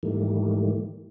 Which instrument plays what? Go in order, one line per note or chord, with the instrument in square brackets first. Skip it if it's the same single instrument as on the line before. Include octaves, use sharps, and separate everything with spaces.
[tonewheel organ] G#2 D#3 E3 G3 A3 A#3